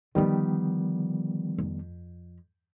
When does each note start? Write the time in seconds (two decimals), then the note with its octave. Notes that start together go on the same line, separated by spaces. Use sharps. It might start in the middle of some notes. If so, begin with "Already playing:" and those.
0.15 D3 D#3 F3 G3 B3
1.58 F2